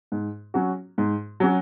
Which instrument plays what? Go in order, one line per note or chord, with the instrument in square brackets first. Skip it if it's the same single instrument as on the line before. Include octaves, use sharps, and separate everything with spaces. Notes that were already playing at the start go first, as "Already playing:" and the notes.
[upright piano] G#2
F#3 C#4 F#4
G#2
F#3 C#4 F#4